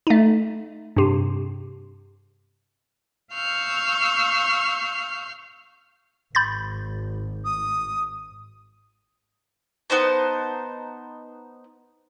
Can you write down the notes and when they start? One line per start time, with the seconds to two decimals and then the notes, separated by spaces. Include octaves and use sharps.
0.07 A3 D#4
0.96 G2 C3
3.33 F5 C#6 E6 F6 G6
6.35 G#1 B5 G6 A6
7.45 D#6
9.90 B3 D#4 C5 A5